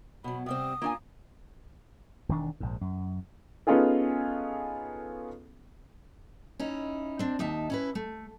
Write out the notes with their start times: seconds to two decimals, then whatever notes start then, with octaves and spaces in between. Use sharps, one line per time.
0.24 B2 F#3 B5
0.46 C3 G3 C4 D#6
0.82 A#3 D4 F4 G#5
2.29 E1 D#3 D4
2.60 A#1 G#2
2.81 F#2
3.67 B3 C#4 D#4 F4 G#4 A4
6.59 C#4 D#4 E4
7.19 C4 D4
7.39 D#2 D#4 E5 A5
7.70 C#4 E4 B4
7.95 A3